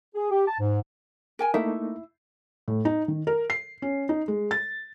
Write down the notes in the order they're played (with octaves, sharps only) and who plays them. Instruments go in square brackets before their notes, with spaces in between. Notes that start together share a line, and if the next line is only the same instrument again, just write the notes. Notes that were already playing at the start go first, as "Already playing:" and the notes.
[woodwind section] G#4
G4
A5
G#2
[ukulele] A#4 G5 G#5
[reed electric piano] A3 A#3 D#4 [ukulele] E4 E5
[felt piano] A2
D#4
D#3
A#4
C7
C#4
D#4
G#3
A6